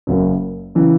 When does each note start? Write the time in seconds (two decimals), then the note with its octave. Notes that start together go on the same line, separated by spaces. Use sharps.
0.07 F#1 F#2 C#3
0.75 C#3 E3